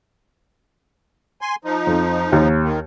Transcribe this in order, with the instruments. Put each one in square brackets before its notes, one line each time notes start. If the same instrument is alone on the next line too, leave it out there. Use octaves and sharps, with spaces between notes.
[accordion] G#5 C6
F3 D#4
[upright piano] F2
D#2
[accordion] D#3